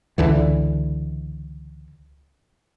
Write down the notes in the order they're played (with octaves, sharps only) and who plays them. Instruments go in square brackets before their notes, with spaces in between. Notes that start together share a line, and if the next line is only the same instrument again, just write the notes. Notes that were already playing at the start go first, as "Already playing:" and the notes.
[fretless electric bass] C#2 D3 E3